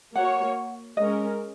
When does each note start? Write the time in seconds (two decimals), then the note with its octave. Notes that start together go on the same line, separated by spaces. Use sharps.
0.15 A#3 F#4 C#5 F#5
0.97 G#3 C#4 A#4 D#5